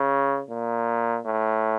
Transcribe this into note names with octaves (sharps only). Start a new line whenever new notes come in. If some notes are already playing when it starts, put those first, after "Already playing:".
Already playing: C#3
A#2
A2